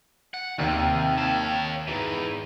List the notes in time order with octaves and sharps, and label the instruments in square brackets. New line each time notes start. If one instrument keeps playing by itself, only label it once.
[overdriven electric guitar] F#5
[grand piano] D#2 [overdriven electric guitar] C3
[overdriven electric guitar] C#5 A5
[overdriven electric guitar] E2 E3 [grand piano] G#2